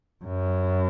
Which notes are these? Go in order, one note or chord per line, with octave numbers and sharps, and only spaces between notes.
F#2